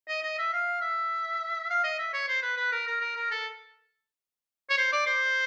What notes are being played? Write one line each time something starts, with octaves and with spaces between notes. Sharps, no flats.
D#5
D#5
E5
F5
E5
F5
D#5
E5
C#5
C5
B4
B4
A#4
A#4
A#4
A#4
A4
C#5
C5
D5
C5